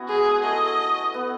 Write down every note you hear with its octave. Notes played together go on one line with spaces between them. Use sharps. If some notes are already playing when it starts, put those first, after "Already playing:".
Already playing: B3 C#4 E4 F#4
G#3 G#4
G#3
A3 D#5
B3